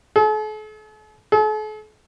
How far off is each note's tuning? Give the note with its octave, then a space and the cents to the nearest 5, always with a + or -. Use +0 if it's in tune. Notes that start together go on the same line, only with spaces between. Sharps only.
A4 -45
A4 -45